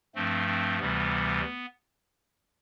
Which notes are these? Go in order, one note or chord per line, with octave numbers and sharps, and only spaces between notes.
G2 F3 A3 C4
C4
D2 C3 E3 G3 B3